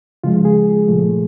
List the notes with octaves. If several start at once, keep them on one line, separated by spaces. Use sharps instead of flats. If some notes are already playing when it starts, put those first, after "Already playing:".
C#3 F3 G#3 F4
G#4
A#2 F3 A3